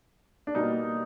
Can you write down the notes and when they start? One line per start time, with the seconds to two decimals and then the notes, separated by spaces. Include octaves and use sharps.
0.47 D4
0.55 B2 G3 A#3 D#4